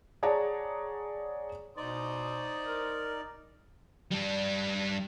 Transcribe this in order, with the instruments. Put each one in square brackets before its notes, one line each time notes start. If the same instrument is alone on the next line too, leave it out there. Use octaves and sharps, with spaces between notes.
[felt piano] G#4 C#5 D5 F#5 A5 A#5
[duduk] B2 [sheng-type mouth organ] D#4 [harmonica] C5 C6 D#6 [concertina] D5
[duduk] A#4
[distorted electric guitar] G3 D4